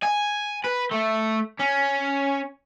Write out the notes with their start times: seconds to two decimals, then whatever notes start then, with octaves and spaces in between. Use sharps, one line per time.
0.03 G#5
0.64 B4
0.91 A3
1.60 C#4